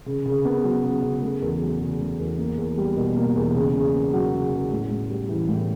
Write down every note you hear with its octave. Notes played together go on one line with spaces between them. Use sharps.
C#3
C#3
B3
F#3
C#3
C#3
A3
E2
F#3
C#3
A3
E2
A#3
E2
G3
B2
A#3
E2
C#3
C#3
B3
F#3
C#3
C#3
A2
A2
G3
E3
A2